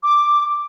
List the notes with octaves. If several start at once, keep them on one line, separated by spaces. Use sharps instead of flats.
D6